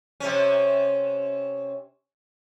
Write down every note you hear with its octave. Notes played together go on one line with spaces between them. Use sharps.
C3 C#4